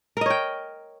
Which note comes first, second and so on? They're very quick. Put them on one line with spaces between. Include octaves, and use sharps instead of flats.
A#4 D#5 C#5 G5